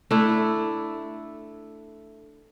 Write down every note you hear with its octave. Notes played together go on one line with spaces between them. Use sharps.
A3 D4 E4